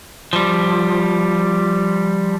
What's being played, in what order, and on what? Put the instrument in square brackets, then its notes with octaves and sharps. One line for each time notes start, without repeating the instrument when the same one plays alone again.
[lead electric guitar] F3 G3